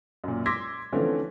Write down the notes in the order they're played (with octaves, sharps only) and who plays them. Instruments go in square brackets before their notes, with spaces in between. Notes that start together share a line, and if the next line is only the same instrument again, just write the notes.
[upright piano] F#2 A#2
C6 D6 E6 G#6 A#6 B6
D3 E3 F3 A3 C4 C#4